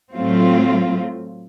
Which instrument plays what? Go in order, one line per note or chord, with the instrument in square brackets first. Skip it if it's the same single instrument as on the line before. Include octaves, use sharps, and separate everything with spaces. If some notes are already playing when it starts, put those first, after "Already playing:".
[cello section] A2 F#3 A3 C4 F4